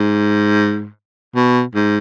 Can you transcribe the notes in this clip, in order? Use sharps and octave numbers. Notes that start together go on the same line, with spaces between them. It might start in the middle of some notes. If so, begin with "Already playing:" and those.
Already playing: G#2
B2
G#2